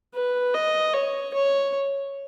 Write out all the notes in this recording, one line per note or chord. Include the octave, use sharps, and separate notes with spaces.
B4
D#5
C#5
C#5